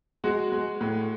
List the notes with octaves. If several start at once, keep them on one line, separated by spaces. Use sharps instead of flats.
G#3 F#4
G#3
A2